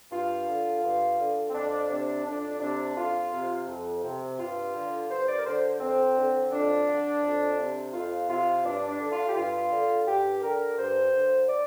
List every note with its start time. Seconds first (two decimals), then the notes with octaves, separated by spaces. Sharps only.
0.11 G2 F4
0.48 D3
0.83 G2
1.18 D3
1.48 C4
1.54 F2 D4
1.89 C3 D4
2.24 F2 D4
2.60 C3 D4
2.95 F2 F4
3.31 C3
3.67 F2
4.03 C3
4.38 G2 F4
4.73 D3
5.08 G2 C5
5.26 D5
5.37 A#4
5.45 D3 C5
5.79 F2 C4
6.16 D3
6.51 F2 D4
6.87 D3
7.22 F2
7.58 C3
7.92 F2 F4
8.28 C3 F4
8.63 G2 D4
8.87 D4
8.99 D3
9.11 F4
9.28 G4
9.35 G2 F4
9.71 D3
10.06 G2 G4
10.42 D3 A#4
10.77 G2 C5
11.12 D3
11.48 D5